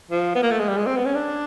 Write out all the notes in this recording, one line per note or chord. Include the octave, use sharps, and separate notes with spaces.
F3
B3
A#3
A3
G#3
G3
G#3
C4
B3
C#4
D4